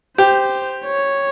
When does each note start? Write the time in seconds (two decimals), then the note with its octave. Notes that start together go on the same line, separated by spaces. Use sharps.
0.18 G4 C5
0.86 C#5